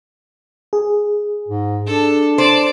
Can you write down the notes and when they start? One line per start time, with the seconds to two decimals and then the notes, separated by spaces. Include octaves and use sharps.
0.73 G#4
1.48 G#2
1.86 D4 A4
2.38 C5 D5 A5